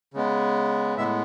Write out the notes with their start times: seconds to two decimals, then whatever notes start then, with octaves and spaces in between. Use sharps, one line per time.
0.14 C#3 G#3 B3
0.97 A2 G#3 B3 E5